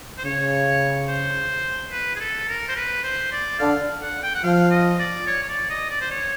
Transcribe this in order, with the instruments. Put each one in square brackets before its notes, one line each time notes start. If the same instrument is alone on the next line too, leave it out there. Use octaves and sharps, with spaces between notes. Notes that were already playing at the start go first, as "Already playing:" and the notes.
[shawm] C5
[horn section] C#3 [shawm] C#5
[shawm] C5
B4
G#4
A4
A#4
C5
B4
C5
D5
[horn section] D3 [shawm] F5
[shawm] F#5
G5
F#5
[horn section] F3 [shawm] F5
[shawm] D#5
D5
C#5
C#5
D5
D#5
D5
C5
C#5